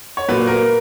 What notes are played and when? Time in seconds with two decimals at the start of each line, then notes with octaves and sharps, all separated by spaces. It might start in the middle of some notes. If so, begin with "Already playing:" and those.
0.17 C#5
0.28 A#2 F#3 B4
0.47 A#4